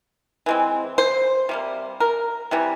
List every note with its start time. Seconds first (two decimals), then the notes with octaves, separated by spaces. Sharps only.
0.46 E3 G#3 C4
0.98 C5
1.49 C3 G3 A#3
2.00 A#4
2.51 C3 E3 G3